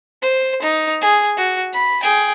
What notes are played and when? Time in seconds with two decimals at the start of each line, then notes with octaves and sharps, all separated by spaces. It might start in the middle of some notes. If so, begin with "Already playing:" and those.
0.22 C5
0.62 D#4
1.01 G#4
1.37 F#4
1.73 B5
2.02 G#4 G5